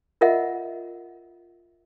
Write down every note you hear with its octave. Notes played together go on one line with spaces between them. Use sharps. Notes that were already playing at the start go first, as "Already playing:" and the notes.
F4 A#4 D#5 E5 F#5